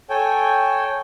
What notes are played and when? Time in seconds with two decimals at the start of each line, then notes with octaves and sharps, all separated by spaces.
0.10 A4 C#5 G5 G#5